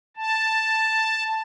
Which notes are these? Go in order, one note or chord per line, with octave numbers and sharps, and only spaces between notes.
A5